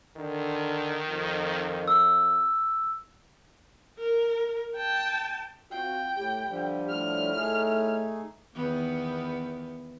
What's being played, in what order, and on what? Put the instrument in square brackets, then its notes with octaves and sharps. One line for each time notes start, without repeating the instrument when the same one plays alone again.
[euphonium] D3 [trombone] D#3
[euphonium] F2
[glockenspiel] E6
[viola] A#4
G5 A5
[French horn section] C4 F4 F#4 [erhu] G5
[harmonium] A2 [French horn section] G4
[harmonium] D3 F3 G3
[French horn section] A2 [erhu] F6
[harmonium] A3 D#4 G#4
[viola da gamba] E2 D#3 B3